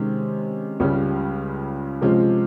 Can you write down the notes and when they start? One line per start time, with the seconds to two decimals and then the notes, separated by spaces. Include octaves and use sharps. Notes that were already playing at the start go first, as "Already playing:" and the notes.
Already playing: C3 D#3 G#3 C#4
0.80 C#2 C#3 G3 C#4
2.01 C3 F3 G#3 C#4 F4